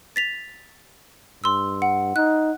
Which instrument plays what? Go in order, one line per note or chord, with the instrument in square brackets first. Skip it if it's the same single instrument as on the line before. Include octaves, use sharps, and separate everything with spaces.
[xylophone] A6 B6 F7
[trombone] G2 [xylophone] C6 E6
[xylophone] F#5
[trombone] D#4 [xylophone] F#6